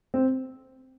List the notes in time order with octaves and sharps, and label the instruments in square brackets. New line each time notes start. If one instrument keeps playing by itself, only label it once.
[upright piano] C4